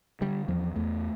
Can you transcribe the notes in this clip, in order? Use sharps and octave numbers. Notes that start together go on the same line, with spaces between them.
D3 G3
E2 F3
E2 A3